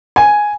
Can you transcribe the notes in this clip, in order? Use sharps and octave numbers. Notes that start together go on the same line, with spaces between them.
G#5